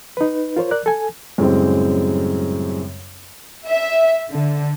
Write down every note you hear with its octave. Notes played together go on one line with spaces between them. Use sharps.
D#4 B4
F4 A#4 C5 C#5
A#4 D5 F#6
A4 G#5
F#2 A2 C#3 G3 G#3 C4
E5
D3